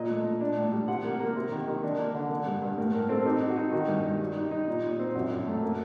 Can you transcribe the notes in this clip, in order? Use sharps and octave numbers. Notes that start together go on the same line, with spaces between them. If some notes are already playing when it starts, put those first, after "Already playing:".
Already playing: A#2 D#5
A3
A#2
D4
A2
G3
C3 F#5
A#3
A#3
C3
D#3
D#3
D4
A#3
D3
A#3
G2
G2
A2 A#4
A2 A#4
C4 A4
D#4 G4
D#4
F#4
D#4
D#3 F#4
G2
G2
G3
D#4
D#4
A#2
A#2
C4
F#2
F#2
A3
A#3